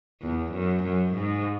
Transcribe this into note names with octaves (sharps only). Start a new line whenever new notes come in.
E2
F#2
F#2
G#2